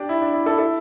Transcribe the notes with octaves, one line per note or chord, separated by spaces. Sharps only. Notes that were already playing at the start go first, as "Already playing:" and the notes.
Already playing: D4 G4 D5
E4
D4
E4
E4 A4
E4 A4